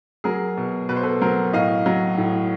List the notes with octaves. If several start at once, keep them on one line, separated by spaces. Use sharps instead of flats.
F#3 G#4 A#4
B2
B2 B4
C5
A4 B4
F#3 A#4 C5
A2 D#5 F5
F#3
A2